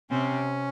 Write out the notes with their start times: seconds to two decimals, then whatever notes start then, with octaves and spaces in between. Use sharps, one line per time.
0.10 C3 C4 C#4